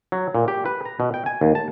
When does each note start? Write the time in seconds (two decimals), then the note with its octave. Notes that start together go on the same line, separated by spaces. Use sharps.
0.12 F#3
0.35 A#2
0.48 G4
0.66 B4
0.85 A#5
1.00 B2
1.14 G5
1.26 G#5
1.41 D#2
1.55 A5